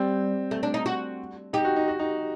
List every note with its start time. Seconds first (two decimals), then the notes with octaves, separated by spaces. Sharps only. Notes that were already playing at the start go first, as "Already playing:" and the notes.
Already playing: G3 C4
0.51 A3
0.63 D4
0.74 D#4
0.86 F#4
1.53 D#4 G4
1.65 F#4
1.76 D#4
1.88 F#4
1.99 D#4